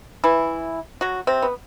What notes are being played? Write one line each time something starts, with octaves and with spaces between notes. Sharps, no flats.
E3 E4
F#3 F#4
C3 C4
B3